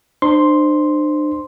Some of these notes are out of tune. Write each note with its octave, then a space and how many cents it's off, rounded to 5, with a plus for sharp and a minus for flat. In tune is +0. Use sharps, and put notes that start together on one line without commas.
D4 +40 C5 -5 C6 +0